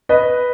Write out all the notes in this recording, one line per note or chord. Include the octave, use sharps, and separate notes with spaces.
B4 D#5